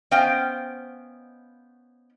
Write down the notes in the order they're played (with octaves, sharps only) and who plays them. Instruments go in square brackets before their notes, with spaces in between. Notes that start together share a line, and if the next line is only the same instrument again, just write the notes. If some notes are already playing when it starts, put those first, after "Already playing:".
[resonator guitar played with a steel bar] B3 C#4 C5 D#5 F5 G5